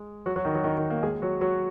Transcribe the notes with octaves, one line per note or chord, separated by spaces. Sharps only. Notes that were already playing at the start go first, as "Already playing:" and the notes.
Already playing: G#3
F#3 F#4
F#3 F#4
D#3 D#4
F#3 F#4
D#3 D#4
D#3 D#4
A#3
G#3 G#4
F#3 F#4
F#3 F#4